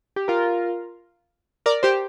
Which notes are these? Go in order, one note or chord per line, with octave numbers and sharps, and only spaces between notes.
G4
F4 A#4
A#4 D5
G4 C5